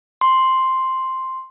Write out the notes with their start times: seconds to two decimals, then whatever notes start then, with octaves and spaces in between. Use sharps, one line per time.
0.21 C6